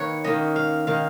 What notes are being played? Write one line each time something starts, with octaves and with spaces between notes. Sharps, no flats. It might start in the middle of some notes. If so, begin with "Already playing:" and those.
Already playing: D#3 A#3 B4 C#5
D#3 A#3 C#4 D#5
F5
D#3 A#3 F5